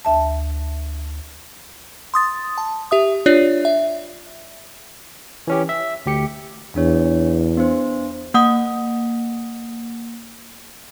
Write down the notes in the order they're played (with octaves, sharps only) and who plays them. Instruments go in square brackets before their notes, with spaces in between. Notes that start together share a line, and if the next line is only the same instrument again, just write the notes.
[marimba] D2 E5 A5
[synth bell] C6 D#6 A6
A5
G4 E5 D#6
D4 F4 C#5 D5
E5
[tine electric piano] E3 C#4 G4
E5
D2 G4 C#7
[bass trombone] E2 [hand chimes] D4 C#5
[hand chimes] B3 D4 C5
[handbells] A#3 F#5 D#6